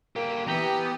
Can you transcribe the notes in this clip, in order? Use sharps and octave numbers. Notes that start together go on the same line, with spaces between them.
D3 A#3 G4
E3 B3 G4 A#5 G6 B6